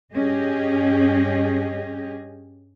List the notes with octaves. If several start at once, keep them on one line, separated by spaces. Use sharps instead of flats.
G2 C#4 G4 G#4 D#5